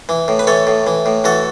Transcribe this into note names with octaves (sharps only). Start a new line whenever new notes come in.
E3
A2
B4
E3 A4 C#5
A2
E3
A2
E3 F#4 A4